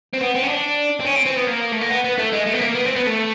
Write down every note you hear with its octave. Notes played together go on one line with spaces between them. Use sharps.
C4
B3
C4
C#4
D4
C4
C#4
C4
C4
B3
A#3
A3
A#3
B3
B3
A3
G#3
A3
B3
A#3
B3
C4
B3
A3